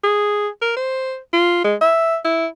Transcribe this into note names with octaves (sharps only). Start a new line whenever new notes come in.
G#4
A#4
C5
F4
G#3
E5
E4